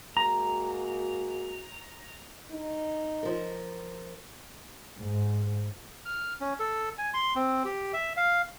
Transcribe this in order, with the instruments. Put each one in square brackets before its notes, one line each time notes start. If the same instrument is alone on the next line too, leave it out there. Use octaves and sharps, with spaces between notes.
[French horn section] G#3 A#3 F#4 [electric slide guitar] A#5
[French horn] D#4
[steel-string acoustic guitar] F3 A#4
[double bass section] G#2
[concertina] F6
C#4
A4
G#5
C6
C4
G4
E5
F5